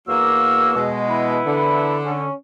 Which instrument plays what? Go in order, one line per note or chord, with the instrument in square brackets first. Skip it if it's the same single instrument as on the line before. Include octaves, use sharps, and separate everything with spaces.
[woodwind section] E2 F#4 E6 [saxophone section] A#3
[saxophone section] B2 G#3
[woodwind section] E3 B3 E4
[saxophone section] D3
[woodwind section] C#4